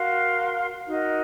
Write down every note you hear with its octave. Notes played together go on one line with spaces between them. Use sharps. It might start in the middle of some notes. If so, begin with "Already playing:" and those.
Already playing: F#4 A#4 F5 C6
D#4 F#4 A#4 D#5